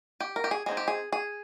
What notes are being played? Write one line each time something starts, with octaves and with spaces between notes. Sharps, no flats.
G4
A#4
G4
G#4
G#3 C4 D#4 G#4
G4
G#4
G#4